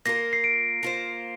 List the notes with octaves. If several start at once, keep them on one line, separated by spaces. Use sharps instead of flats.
A#3 F4 A#4 A#6
C7
D7
A#3 F4 C5